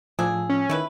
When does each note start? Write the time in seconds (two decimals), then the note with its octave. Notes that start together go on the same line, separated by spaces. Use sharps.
0.19 A2 F3 D4 G#4 E6
0.49 C#4
0.70 D#3 A3 E4 B4